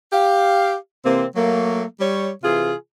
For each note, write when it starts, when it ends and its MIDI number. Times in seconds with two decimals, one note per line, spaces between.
0.13 0.75 67
0.13 0.75 77
1.05 1.25 48
1.05 1.25 52
1.05 1.25 58
1.05 1.25 60
1.36 1.84 54
1.36 1.84 57
1.36 1.84 58
2.00 2.30 55
2.00 2.30 73
2.44 2.74 48
2.44 2.74 52
2.44 2.74 65
2.44 2.74 68